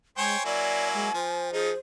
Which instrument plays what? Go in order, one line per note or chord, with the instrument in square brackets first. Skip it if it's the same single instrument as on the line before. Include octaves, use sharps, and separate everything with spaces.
[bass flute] G#3 [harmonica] C5 C#5 G5 [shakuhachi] G#5
[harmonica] F#3 A#3 E4 [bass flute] D5
[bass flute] G#3
[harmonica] F3 [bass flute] C5
[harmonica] F3 D#4 [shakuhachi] G#4